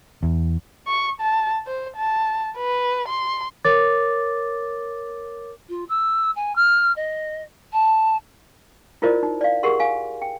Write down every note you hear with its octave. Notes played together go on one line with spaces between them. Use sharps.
E2
C#6
A5
C5
A5
B4
C6
A#4 C#5 D6 A6
F4
E6
G#5
F6
D#5
A5
E4 F4 A#4 C5 D5 D#5
D#4
D5 F5
G4 G#4 A#4 F#5 C6
F5 G#5
G5